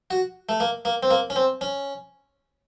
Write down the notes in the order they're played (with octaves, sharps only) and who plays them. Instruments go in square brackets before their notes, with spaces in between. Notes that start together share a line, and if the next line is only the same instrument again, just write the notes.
[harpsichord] F#4
A3
A#3
A#3
C4
A#3
C#4
C4
C#4